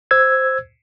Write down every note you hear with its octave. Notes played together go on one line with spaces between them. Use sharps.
C5 E6 G#6